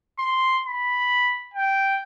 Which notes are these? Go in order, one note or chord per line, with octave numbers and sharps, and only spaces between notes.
C6
B5
G5